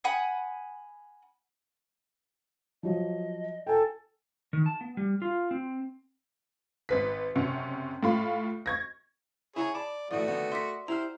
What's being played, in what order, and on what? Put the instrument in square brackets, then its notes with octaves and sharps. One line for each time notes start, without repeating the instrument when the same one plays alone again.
[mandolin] F#5 G#5 B5 D#6
[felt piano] F3 F#3 [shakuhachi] D#5
[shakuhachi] A4 [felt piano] G5 G#5
[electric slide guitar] D#3
A5
B3
G3
F4
C4
[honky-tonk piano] G#1 B4 B6
F#1 C3 C#4 F#5
A2 F4 B5
C#6 G#6 A#6
[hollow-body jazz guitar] E4 F#5 A#5 [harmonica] G#4 C#5
[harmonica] D5 [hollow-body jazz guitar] A5 B5
[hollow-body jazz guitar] A2 D#3 E3 [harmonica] A3 F#4 D#6 [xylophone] D5
[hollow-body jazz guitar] D3 D#3 B3 [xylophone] F#5
[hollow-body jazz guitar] A#4 E5 [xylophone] C6 D6 B6
[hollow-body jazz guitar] E4 G4 [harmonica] C5 [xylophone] A#5 F6